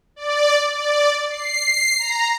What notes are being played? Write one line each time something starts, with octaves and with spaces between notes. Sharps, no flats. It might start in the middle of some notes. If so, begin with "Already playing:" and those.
D5
D5
C7
A#5